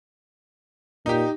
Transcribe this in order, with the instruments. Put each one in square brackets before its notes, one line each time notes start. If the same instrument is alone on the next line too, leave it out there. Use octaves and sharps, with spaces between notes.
[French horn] A#2 [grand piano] D#4 G4